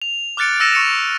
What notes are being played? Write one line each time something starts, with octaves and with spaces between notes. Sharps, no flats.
F7
D6 F6 F#6 A6 C#7 D7
E6 A6 A#6 C#7 D#7 E7
C#6 C#7 D#7 E7